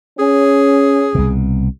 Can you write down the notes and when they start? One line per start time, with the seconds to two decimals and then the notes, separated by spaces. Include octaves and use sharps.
0.19 C#4 G#4
1.15 C2 B2